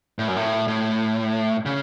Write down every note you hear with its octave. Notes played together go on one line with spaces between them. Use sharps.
A2
F#2
A2
A2
C#3